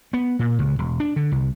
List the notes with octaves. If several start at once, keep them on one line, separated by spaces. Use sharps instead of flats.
B3
A#2
C#2
E1
D4
D3
C2